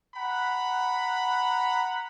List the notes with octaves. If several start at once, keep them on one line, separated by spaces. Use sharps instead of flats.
F#5 A#5 B5